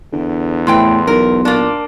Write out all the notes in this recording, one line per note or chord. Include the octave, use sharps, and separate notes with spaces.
E2 D3
F2 A2 E3 G5 C6
B1 A#4
A#2 A#3 D4